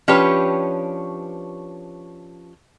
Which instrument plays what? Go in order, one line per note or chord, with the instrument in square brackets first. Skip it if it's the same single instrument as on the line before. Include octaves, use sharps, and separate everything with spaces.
[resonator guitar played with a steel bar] F3 C#4 D4 G4 B4 C#5